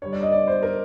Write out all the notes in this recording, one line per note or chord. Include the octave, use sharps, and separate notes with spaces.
D3 G3 C#5
D5
D#5
D5
C5
A#4